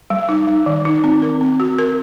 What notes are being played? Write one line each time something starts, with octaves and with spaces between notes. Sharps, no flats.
G3
D#4
G3
D#3
D#4
C4
A#4
C4
F#4
A#4